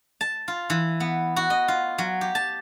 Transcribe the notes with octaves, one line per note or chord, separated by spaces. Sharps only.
A5
F4
E3
B3
F#4
D#5
F4
F#3
G4
A5